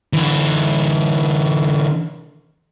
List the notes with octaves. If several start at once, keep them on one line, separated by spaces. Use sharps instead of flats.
D3 E3